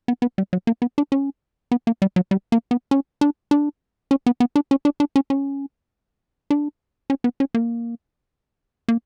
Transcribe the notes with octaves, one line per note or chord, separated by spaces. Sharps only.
B3
B3
G3
F#3
A#3
B3
D4
C#4
B3
A#3
G3
F#3
G3
A#3
B3
C#4
D4
D4
C#4
B3
B3
D4
C#4
D4
D4
C#4
C#4
D4
C#4
B3
C#4
A#3
A#3